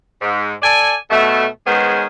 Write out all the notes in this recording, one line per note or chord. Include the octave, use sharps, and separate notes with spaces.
G#2
A4 D5 G#5
B2 A3
D#3 G#3 B3 C#4 G#4 C5